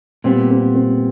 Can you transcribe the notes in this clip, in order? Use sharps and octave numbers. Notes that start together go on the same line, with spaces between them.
A#2 G3 B3 C4
C4
C4